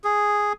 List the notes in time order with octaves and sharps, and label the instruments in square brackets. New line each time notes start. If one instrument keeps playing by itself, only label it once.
[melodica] G#4